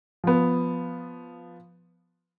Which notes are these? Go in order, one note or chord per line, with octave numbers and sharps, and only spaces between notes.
F3 B3